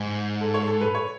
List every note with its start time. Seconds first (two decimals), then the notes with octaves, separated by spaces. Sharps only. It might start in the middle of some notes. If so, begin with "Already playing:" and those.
Already playing: G#2
0.41 A4
0.54 C#5
0.67 A4
0.81 B4
0.95 C#5